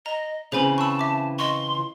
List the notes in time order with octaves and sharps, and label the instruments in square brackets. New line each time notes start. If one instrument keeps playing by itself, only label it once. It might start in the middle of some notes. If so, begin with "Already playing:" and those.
[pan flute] D#5 [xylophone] A#5
[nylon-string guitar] C#3 E3 C4 [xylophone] G#4 C5 G#5 [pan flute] B5
[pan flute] A5 [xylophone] C#6 E6
[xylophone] E5 D6
[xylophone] D#5 C#6 [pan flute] C6